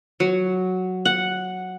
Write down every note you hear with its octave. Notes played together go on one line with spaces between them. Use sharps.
F#3
F#5